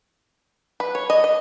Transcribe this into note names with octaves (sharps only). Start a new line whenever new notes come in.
B4
C#5
D#5
D#5